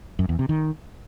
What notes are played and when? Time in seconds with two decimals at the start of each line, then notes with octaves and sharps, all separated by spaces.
0.19 F#2
0.29 E2
0.39 C3
0.49 D#3